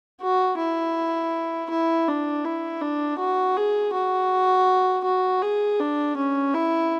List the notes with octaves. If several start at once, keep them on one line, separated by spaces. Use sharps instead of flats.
F#4
E4
E4
D4
E4
D4
F#4
G#4
F#4
F#4
G#4
D4
C#4
E4